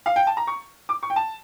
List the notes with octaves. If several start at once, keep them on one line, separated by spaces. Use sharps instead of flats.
F5
G5
A5
A#5
C#6
D6
C#6
G5
A5